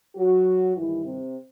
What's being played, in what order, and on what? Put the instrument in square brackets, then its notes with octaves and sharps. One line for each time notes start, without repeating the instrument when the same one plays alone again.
[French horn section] F#3 F#4
G2 D#3 E3 G3 E4
C3 C4